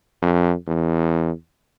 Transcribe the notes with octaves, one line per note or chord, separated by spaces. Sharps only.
F2
E2